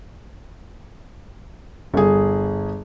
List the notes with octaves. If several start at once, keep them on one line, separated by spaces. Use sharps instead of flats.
G1 G#4